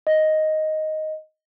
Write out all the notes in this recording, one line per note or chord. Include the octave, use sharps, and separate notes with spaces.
D#5